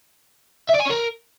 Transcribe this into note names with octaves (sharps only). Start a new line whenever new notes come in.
E5
D5
G#5
C#5
A#4